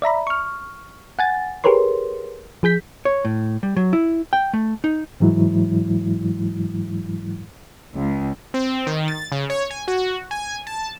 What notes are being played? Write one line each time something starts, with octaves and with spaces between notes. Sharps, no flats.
D5 E5 A#5 B5
C#6 F6
F#5 G#5 A6
G4 G#4 A#4 B4 C#5 C6
F3 G#4 G6 B6
C#5
A2
G3
F#3
E4
G5
A3
D#4
G#2 E3 F#3 G#3 E4
C#2
C4
D#3
A6
C#3
C#5
G#5
F#4
G#5
A5